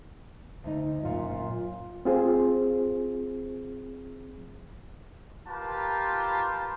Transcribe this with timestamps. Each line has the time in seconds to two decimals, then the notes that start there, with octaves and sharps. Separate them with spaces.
0.64 D2 D#4
1.03 F#2 A#2 F4
2.05 C4 F4 G#4 C5
5.48 F4 G4 A#4 B4 A5